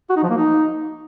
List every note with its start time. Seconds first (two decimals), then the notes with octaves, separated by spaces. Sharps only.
0.10 F#4
0.17 D#4
0.23 F3
0.30 A#3
0.37 D#4